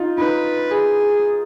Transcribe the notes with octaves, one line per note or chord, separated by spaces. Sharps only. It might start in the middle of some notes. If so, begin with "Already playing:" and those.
Already playing: D#4 F4
D#4 B4
G#4